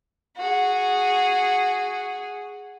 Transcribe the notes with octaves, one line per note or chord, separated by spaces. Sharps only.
F#4 G#4